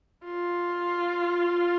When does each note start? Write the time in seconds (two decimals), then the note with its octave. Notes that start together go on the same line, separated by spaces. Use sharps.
0.24 F4